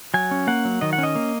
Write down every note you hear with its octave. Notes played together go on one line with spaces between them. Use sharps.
F#3 G#5
C#4
A#3 F#5
F#3
D#3 D#5
F#5
C#4
D#5
A#3